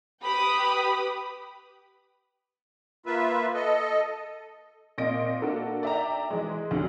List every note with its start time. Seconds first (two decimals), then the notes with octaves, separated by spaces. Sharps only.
0.24 G4 B4 G5 B5 D#6
3.06 A#3 F4 B4 E5
3.54 A4 D#5
4.98 A#2 C4 D#5 A#6 D7
5.41 A#3 D4 F#4 A4 A#4
5.83 D5 E5 G5 A#5
6.30 E3 G#3
6.71 D2 D3 F#3